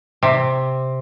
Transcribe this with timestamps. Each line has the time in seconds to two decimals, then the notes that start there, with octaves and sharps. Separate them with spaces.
0.23 C3